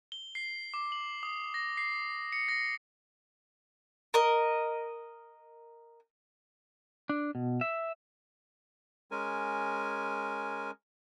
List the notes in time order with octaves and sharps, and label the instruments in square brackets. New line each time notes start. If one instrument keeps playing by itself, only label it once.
[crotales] G7
C7
D6
F#7
D#6
A#6
C7
C#7
A#6
[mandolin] A#4 D#5
[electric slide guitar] D4
B2
E5
[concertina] G#3 C#4 A#4 G#5